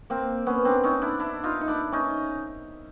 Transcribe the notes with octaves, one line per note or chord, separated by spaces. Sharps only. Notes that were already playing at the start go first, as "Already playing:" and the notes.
A#3 C4
B3 C#4
C4 D4
C#4 D#4
D4 E4
D4 E4
D#4 F4
D#4
D4 E4
C#4 D#4